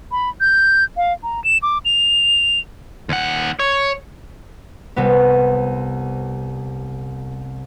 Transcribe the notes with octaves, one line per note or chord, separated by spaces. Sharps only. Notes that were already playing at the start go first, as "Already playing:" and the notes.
B5
G6
F5
A#5
E7
D6
F7
D#2 F#5
C#5
C2 C3 B3